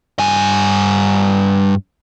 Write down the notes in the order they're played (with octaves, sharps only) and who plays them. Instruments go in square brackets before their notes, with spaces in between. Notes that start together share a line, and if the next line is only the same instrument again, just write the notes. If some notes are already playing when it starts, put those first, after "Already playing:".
[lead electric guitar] G2 G#5